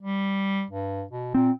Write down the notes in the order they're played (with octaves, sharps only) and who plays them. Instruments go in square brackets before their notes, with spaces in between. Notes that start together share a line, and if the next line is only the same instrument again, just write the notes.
[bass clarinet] G3
G2
B2
[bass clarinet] A#2 [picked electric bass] C4